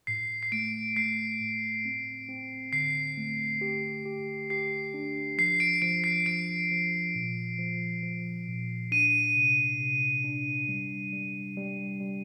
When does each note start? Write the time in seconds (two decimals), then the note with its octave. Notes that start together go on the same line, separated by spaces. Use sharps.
0.07 A2 C7
0.43 C7
0.52 A3 D7
0.96 A3 C7
1.40 A2
1.85 C4
2.29 C4
2.73 D3 C7
3.17 A3
3.61 G4
4.06 G4
4.50 G4 C7
4.94 D4
5.38 F3 C7
5.60 D7
5.82 F3 D7
6.04 C7
6.26 F3 D7
6.71 F3
7.15 A#2
7.58 F3
8.03 F3
8.48 A#2
8.92 D4 D#7
9.35 C3
9.80 C3
10.24 D4
10.69 G3
11.12 G3
11.57 G3
12.01 G3